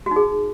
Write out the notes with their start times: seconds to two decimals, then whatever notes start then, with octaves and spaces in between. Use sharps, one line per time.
0.06 F#4
0.11 D#4
0.16 G#4